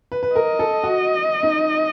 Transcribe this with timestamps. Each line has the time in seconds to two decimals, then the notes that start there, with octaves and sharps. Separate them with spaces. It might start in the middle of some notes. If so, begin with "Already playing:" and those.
0.12 B4
0.23 B4
0.35 A#4 D#5
0.59 A4
0.84 F#4
1.43 D#4